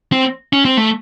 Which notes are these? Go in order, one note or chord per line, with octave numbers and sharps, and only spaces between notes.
C4
C#4
C4
A3